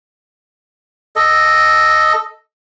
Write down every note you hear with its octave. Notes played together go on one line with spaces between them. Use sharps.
A4 D#5